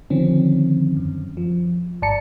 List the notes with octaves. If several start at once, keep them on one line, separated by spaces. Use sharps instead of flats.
D3 D#3 F3 C4 C#4
F#2
F3
G#1 G2 D5 A5 A#5 C#7